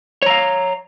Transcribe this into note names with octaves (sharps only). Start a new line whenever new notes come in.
C#5 F5 A#5